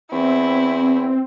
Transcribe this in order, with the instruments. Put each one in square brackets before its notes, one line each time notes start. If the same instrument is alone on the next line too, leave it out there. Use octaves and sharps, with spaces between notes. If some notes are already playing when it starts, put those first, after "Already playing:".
[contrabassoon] E2 [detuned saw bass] C4 [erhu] E4